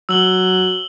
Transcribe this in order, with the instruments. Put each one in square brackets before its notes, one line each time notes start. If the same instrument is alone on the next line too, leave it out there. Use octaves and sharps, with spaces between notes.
[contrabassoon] F#3 [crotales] E6 F#7 G7